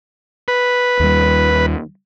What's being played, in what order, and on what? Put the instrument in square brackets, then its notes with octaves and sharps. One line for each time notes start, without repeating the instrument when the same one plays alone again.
[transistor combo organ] B4
[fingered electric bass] D#2 G3